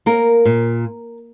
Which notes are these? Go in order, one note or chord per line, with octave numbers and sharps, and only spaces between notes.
A#3 A#4
A#2